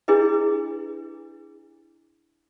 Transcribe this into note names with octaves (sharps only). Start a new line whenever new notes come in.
D4 E4 G#4 B4 D#5